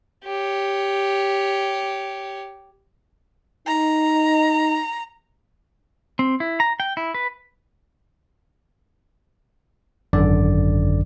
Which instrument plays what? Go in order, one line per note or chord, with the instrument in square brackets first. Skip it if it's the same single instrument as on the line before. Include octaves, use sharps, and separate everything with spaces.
[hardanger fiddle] G4 C#5
[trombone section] D#4 [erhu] A#5
[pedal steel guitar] C4
E4
A#5
G5
E4
B4
[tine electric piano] G#1 F#2 D3 D5